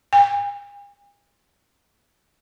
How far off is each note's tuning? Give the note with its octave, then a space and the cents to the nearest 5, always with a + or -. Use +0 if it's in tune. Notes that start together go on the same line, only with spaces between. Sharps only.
G#5 -40